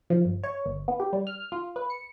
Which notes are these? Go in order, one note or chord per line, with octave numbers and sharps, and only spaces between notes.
F3
G1
C#5
G1
B3
G4
G3
F6
F4
B4
C#7